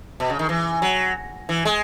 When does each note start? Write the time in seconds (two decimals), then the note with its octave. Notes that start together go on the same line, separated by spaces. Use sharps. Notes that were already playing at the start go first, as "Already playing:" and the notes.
0.20 B2
0.30 C#3
0.39 D#3
0.49 E3
0.82 F#3
1.49 E3
1.65 G#3